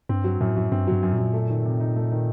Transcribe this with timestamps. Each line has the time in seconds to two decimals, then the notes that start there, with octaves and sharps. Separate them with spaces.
0.09 G2 C4
0.24 F#3
0.41 F#2 A2
0.56 F#2
0.72 G2 C4
0.87 G2 F#3
1.03 F#2
1.13 F#2 A#2
1.33 A3
1.50 D#3
1.65 C3
1.80 D#4
1.96 A3
2.12 D#3